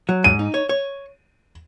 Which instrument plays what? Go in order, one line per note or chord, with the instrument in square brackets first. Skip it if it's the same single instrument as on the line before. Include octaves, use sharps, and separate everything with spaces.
[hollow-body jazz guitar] F#3
[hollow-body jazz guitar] G#2 [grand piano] D#7
[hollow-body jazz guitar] D#4
C#5
C#5